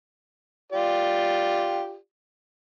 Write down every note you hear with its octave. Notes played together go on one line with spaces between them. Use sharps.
F4 G4 D5